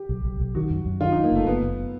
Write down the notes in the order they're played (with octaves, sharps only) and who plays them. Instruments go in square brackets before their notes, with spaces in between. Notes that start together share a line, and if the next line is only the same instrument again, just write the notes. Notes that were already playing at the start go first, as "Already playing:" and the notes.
Already playing: [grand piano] G4
[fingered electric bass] B1
B1
B1
[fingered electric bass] D#3 [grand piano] F#4
[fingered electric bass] F#2
F#2
[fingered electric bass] D#3 [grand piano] F4
[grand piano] D#4
[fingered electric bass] F#2
[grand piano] A#3
[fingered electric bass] F#1 [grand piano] A3
[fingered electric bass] F#1 [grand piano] B3
[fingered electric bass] F#1